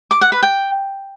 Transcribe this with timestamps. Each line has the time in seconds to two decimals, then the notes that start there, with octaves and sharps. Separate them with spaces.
0.11 D6
0.21 F#5
0.32 B4
0.43 G5